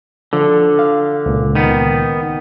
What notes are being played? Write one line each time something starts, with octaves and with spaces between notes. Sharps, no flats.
D3 F3 A4
F5
C#2 A#2
D#3 B3